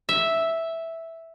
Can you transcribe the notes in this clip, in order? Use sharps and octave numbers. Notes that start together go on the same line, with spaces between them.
E5